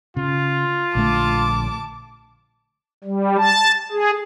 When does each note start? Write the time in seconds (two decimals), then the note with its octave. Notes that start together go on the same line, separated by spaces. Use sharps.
0.17 C#3 F4
0.95 A#1 D3 A3 A5 D6
3.04 G3
3.39 A5
3.92 G#4